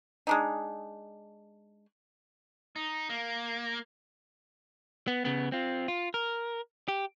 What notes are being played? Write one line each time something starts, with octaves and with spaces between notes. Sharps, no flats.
G#3 D4 D#4
D#4
A#3
B3
C#3 B3
C4 F4
F4
A#4
G4